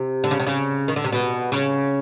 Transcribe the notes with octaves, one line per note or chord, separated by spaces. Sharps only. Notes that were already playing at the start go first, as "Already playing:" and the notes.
Already playing: C3
D3
C#3
C3
C#3
D#3
D3
C3
B2
C#3